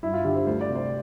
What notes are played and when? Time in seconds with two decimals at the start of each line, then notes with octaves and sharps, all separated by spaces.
0.03 G2 E4
0.14 F4
0.25 D3 G4
0.36 C5
0.47 D2 C5
0.61 D5
0.69 C3
0.76 C5